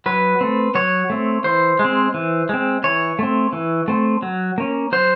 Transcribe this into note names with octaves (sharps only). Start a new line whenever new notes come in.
F#3 B4
A3 C4
F#3 C#5
A3 C4
E3 C5
G#3
C4
E3
G#3 C4
E3 C#5
A3 C4
E3
A3 C4
F#3
A#3 C#4
F#3 C5